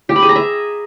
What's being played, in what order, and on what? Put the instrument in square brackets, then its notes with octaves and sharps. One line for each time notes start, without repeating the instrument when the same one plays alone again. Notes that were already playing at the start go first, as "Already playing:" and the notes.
[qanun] G4
B5
G#4
A#5
E5